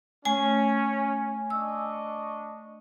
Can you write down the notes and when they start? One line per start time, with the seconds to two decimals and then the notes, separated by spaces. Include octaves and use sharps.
0.25 A3 C#4 G#5
1.50 D4 D#5 C#6 E6